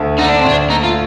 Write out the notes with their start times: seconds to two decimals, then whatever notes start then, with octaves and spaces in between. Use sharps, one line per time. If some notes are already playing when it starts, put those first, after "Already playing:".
Already playing: D2 A3
0.19 D3 D#4
0.29 D4
0.40 C4
0.45 D2 D4
0.70 A3 D#4
0.84 F4